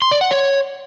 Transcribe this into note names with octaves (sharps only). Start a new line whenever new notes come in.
C6
D5
F#5
C#5